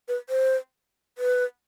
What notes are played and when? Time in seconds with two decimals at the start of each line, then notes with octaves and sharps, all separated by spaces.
0.08 B4
0.29 C5
1.18 B4